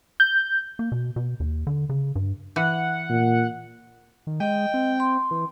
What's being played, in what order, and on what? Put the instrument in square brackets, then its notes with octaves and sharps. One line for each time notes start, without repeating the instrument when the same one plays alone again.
[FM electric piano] G6
[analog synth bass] A#3
B2
B2
D#2
D3
C#3
G2
[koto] E3 [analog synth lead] F#5
[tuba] A#2
[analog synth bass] D#3
[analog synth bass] G#3 [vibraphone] D#5 [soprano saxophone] G5
[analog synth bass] C4
[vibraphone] C6
[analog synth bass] E3